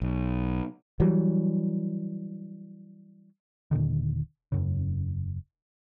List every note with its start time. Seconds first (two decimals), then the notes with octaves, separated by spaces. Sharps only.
0.02 B1
1.00 E3 F#3 G3
3.71 D#1 A#2 D3 D#3
4.52 E1 F#2 C#3